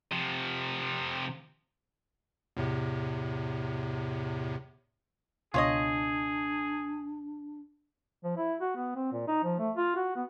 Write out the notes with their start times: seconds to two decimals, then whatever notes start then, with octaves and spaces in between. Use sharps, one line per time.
0.11 C3 F3
2.57 E2 A2 C3
5.54 C#2 B2 D4 F4 G#4 C#5 D#5
8.24 F3
8.37 E4
8.61 F#4
8.76 B3
8.96 C4
9.12 A#2
9.27 D#4
9.44 F3
9.59 A3
9.77 F4
9.96 F#4
10.16 B3